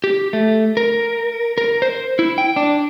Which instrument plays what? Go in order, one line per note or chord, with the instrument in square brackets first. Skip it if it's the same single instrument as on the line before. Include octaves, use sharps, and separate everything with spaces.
[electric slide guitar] G4
A3
A#4
A#4
C5
E4
G5
D4